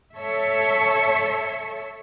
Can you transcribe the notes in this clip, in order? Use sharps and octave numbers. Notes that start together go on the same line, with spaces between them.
A4 C#5 E5